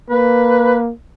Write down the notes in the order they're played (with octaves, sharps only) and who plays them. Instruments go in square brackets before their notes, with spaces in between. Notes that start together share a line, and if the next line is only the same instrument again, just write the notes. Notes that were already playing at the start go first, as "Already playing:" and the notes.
[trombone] A#3 [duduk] B4